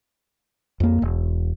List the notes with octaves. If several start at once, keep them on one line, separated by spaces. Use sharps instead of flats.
F2 A#3
E1